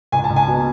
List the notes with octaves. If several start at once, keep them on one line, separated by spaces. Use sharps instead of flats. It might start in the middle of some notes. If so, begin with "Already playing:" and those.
C#2 G#5
A5
C#2
G#5
B2